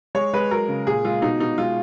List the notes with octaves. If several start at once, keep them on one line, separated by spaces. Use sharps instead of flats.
G#3 C#5
G#3 B4
F#3 A#4
C#3
A#2 G#4
G#3 F4
B2 D#4
B2 D#4
G#3 F4